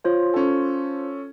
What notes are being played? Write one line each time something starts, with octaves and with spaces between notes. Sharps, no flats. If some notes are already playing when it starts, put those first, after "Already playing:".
F4 C5 C#5
C#4 A4